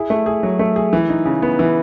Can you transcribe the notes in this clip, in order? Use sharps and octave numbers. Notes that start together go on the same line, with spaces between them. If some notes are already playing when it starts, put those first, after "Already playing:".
Already playing: E4 G#4
A3
G#4
F#3
A3
G#4
E3
D#4
C#3
B3
E3